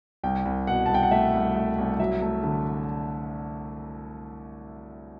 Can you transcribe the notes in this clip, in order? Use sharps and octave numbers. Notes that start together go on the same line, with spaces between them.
C2 G5
C2
B2 F#5
A5
C2 G5
F#5
A3 E5
C2
A3
C2
F#3 E5
A3
D3